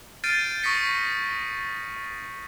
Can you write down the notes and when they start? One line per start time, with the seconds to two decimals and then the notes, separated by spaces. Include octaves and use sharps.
0.24 F6 G6 A6 C7 D7 D#7
0.62 C#6 D#6 A#6 B6 C#7 D7